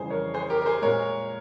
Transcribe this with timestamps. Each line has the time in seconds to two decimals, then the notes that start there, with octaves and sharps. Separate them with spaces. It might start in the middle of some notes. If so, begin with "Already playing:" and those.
Already playing: F2 C#3 E3 G3 G#4 C5
0.10 A#4 C#5
0.34 G#4 C5
0.50 G4 A#4
0.62 A#4
0.66 G#4 C5
0.82 A#2 G#3 A#4 C#5